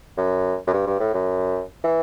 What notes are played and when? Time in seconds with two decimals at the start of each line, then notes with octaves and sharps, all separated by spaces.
0.17 F#2
0.67 F#2
0.73 G2
0.86 G2
1.00 A2
1.14 F#2
1.84 E3